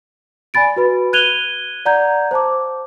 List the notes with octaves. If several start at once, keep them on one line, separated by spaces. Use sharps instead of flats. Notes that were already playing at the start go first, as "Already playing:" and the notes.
D5 G#5 B5 A6 D7
F#4 B4 B5
F#6 G#6 D#7 F7 G7
D5 F#5 A#5 G6 G#6
C5 A5 D6